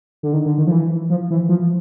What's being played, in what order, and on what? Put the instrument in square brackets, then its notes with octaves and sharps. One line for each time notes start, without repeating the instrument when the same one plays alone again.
[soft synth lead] D3
D#3
D3
D#3
F3
E3
F3
E3
F3